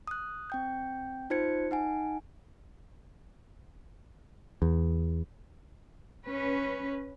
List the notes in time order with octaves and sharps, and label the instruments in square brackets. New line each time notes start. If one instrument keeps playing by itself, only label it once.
[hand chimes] D#6 F#6
C4 G5 G6
D#4 F4 C5 G#6 C#7
D#4 F#5 G#5
[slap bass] E2
[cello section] C#4 B4